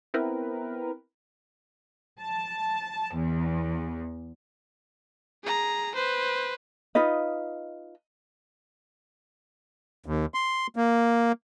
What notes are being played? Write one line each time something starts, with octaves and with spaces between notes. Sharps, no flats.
B3 C4 E4 A#4 B4 G5
A5
E2
G#4 A#5
B4 C5
D#4 F4 B4 D#5
D#2
C6
A#3